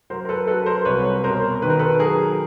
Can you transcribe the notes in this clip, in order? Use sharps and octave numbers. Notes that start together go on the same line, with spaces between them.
F#3 A#4 C5
A#4
A4 B4
F#3 A4 B4
A#4 C5
C2 B4 C#5
B2 A#4 C5
D#3 B4
A#4
A4 B4
F#3 G#4 A#4